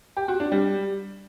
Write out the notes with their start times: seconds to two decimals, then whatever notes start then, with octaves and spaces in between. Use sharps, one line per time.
0.17 G4
0.28 F#4
0.40 D4
0.52 G3